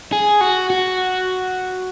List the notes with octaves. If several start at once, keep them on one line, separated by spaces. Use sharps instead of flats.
G#4
F#4
F#4